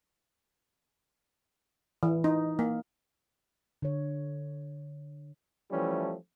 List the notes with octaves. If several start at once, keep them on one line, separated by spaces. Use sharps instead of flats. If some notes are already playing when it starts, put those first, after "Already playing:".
E3
D#4
A#3
D3 C#5
E3 F3 G3 A3 C#4